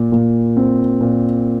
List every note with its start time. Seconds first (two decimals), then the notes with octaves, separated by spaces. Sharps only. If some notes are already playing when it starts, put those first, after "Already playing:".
Already playing: A#2
0.12 A#2
0.57 C4
1.01 A#2